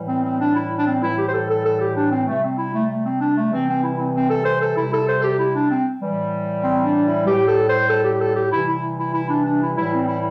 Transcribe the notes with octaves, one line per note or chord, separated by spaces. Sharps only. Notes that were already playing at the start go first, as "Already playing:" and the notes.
Already playing: A2 E3 G3
C4
C4
D4
E4
D4
C4
A2 E3 G3 E4
G4
C5
A4
A4
A4
G4
D4
C4
C3 G3 A3
C4
E4
A3
A3
C4
D4
A3
C3 E3 G3 C4
C4
E4
C4
C4
A4
C5
A4
C3 G3 E4
A4
C5
A4
G4
E4
D4
C4
A2 E3 G3
C4
D4
E4
A2 G3 G4
A4
C5
A4
G4
A4
G4
C3 E3 G3 E4
E4
E4
E4
D4
D4
E4
A2 E3 G3 E4
C4
E4